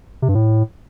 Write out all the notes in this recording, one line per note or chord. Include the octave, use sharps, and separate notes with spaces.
C3
G2
A2